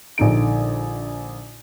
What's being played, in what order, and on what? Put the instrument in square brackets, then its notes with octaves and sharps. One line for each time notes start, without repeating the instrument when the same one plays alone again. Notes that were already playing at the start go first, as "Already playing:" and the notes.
[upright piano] A#1 D3 D#4 D7